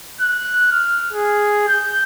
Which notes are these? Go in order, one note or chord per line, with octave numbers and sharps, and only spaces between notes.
F#6
F6
G#4
G6